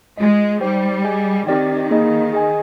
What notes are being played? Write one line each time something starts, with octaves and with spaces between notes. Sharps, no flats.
G#3 F4 G#4 D#5
G3 D#4 G4 C5 G5
G#4 D#5 G#5
D#3 C4 G4 D5 G5
A#3 D#4 G#4 D#5
G#4 D#5 G#5